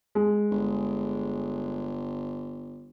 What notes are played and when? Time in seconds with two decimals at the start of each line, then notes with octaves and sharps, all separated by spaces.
0.15 G#3
0.51 G1